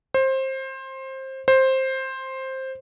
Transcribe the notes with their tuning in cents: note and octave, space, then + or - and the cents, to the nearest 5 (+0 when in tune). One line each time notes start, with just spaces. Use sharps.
C5 +20
C5 +10